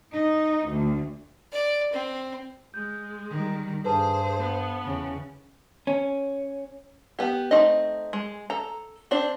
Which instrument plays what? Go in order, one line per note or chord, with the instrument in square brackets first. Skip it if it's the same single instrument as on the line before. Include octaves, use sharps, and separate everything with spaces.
[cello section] D#4
D2
[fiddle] D5
C4
[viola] G#3 [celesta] G6
[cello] D#3 G3
[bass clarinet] G2 [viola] G#4 [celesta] A4 B4 A5 [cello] C5
[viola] B3
[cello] E2 C#3
[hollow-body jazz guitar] C#4
[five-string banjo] B3 G4
A3 C4 D#4 D#5
G#3
A4 A#5
C4 D4 C5 D5